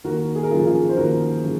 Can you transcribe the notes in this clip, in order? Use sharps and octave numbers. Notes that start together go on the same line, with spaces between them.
D#2 F#4 A#4
G#4
A#4
C#3 F3 F4 G#4
F4 G#4
C5
D#2 F#4 A#4
C#3 F3